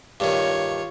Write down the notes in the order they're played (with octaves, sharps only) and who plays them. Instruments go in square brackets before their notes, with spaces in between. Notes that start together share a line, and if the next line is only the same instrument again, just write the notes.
[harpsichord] G2 D#3 [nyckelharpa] F4 C#5